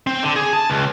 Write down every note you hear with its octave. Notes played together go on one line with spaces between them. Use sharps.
C4
D3
G#4
A5
C#2